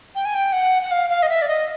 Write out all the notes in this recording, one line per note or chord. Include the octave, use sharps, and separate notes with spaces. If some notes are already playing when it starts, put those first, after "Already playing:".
G5
G#5
G5
F#5
F#5
F5
F5
D#5
E5
D5
D#5